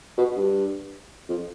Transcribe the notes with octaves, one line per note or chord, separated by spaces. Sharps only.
B2
G2
F2